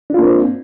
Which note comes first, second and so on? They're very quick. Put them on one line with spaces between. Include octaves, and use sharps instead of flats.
D4 F4 A#3 C4